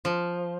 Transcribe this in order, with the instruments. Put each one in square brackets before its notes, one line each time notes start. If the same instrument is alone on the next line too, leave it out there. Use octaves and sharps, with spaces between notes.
[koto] F3